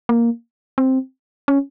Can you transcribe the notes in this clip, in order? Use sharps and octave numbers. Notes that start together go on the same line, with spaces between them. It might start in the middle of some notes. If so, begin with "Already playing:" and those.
A#3
C4
C#4